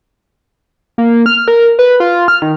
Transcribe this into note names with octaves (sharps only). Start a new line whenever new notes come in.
A#3
F6
A#4
B4
F4
F6
D#3